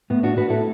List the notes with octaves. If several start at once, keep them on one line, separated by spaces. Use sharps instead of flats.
A2 B3
D4 F#4
A2 F#4 B4
E4 A4